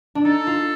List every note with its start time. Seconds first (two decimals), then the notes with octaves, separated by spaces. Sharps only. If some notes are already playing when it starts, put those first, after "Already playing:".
0.15 D4
0.25 D#4 A4
0.47 F4